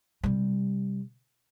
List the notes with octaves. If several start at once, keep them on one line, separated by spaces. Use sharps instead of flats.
C3 G3